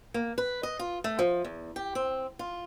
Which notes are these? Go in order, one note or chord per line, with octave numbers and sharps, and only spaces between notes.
A#3
B4
D#5
F4
A3
F3
E2
G4
C4
F4